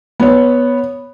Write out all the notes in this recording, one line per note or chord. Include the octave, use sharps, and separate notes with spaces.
B3 C#5